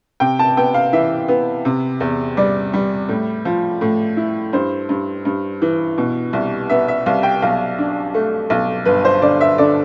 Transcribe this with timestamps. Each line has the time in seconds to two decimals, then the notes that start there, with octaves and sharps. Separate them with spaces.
0.20 C3 G5
0.39 A5
0.57 B3 G5
0.74 F5
0.93 E3 E5
1.28 B3
1.65 C3
2.00 E2
2.37 G3 D5
2.73 G3
3.09 A2
3.45 F3
3.81 A2
4.17 E4
4.53 G2 C5
4.89 G2
5.25 G2
5.62 E3
5.98 B2
6.33 C2
6.69 B3 E5
6.88 E5
7.06 C2 F5
7.23 G5
7.42 B1 F5
7.78 D4
8.14 A3
8.50 B1
8.85 G1 B4
9.05 C5
9.22 D3 D5
9.41 E5
9.58 D3 D5